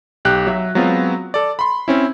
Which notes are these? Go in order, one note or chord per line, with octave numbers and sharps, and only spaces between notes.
B1 G4 F#6
F#3 E5
F#3 G#3 B3 C4 F4
A4 D5
B5 C6
C4 C#4 E4